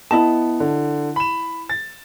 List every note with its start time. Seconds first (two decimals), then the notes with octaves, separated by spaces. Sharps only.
0.11 B3 E4 D#5 A5
0.60 D3
1.16 B5 E7
1.69 A6